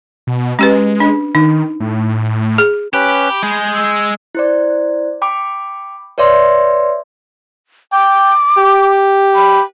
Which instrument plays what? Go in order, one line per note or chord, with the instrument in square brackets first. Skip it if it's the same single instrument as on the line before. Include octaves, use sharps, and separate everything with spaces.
[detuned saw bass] B2
[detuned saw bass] G#3 [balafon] C#4 G4 B4
[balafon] D4
[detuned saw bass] D#3 [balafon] D#4
[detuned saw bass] A2
[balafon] G#4
[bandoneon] C#4 B4 F#6 [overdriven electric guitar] G4 [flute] B5
[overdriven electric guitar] G#3 G#4 [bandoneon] G6
[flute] E6
[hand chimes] E4 C5 D5
G5 B5 D6
B4 C#5 D5 E5 C6
[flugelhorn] G5 [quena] D6
[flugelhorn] G4
[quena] B5